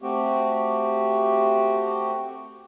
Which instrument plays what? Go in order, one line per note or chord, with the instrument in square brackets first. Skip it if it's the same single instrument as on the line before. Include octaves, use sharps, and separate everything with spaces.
[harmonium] A3 C4 F#4 G4